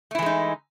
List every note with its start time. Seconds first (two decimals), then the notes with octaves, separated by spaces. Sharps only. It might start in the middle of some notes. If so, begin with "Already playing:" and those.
0.11 A3
0.15 E4
0.19 E3
0.22 G#3
0.26 D#4